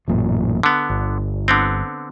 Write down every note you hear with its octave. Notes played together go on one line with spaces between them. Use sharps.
A1 F#2 A#2
D3 B3
G1
D3 B3 C4